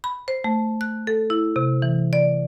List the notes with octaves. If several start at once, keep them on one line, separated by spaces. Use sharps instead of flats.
B5
C5
A3
F#6
A4
E4
C3
E3
D5